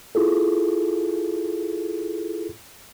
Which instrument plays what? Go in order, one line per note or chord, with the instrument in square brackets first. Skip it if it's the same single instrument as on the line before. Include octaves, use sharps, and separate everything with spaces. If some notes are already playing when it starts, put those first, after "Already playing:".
[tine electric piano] E4 F4 G#4 A4